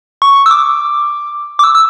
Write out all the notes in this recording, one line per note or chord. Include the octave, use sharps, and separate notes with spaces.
C#6
E6
D6
D6
E6
E6